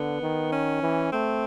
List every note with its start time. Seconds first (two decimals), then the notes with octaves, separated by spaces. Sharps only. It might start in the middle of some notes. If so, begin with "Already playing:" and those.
Already playing: D3 B3
0.22 D#3
0.52 C#4
0.82 E3
1.12 A3 C4